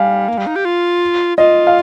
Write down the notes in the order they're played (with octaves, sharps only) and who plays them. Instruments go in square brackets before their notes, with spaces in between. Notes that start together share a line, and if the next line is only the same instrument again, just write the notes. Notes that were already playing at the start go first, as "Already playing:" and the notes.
Already playing: [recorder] G3 [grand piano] F5 G#5
[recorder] A#3
G3
D#4
G4
F4
[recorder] F4 [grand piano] D#5
[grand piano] F5